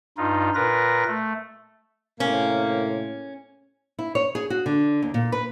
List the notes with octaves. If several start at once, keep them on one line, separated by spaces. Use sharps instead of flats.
G2 D#4 F4
A#2 F4 A#4 B4 A#6
A3
A2 C3 A#3 C#4
E4
C#5
G#4
F#4
D3
D#2
A#2
B4